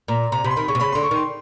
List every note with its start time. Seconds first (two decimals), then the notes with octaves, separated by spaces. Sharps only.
0.08 A#2 A#5
0.32 C3 A#5
0.44 C3 B5
0.51 C6
0.56 D#3 B5
0.68 C#3 C#6
0.75 C3
0.80 C#3 B5
0.92 D3 C6
1.03 C#6
1.11 D#3 C6